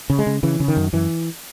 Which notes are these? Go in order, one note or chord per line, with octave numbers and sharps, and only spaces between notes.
C#3
G#3
C#3
C#3 E3
C#3
D#3
F#2
F#2 E3